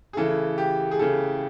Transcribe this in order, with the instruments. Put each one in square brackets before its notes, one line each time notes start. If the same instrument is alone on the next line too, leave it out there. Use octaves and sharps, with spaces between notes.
[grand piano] G#4
C#3 E3 A3 A4
G4
G#4
C#3 E3 A3 A4